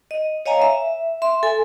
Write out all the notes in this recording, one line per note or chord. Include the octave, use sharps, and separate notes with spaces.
D#5
C#5 D#5 F5 G#5 A#5
E5
E5 C6
A4 G#5